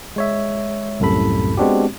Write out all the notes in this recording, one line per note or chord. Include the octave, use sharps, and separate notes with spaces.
G#3 C#5 E5
C2 F#2 A2 C3 A4 B5
G#3 B3 C4 D4 F#4 G4